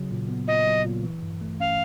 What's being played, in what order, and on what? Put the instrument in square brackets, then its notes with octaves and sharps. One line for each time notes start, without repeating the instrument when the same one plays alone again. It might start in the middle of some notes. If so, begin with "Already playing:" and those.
Already playing: [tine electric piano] C#3 F#3
A#2
B3
[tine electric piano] A#2 [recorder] D#5
[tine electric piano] F#3
A#2
E3
G2
A3
[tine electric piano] C#4 [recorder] F5